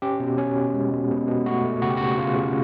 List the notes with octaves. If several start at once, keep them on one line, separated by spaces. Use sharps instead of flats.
C#4 G4
B2
C#4
B2
G#3
B2
B2
B2
A3 F#4
A3
C#3 F#4
G4
C#3 F#4
C#3 F4
C#3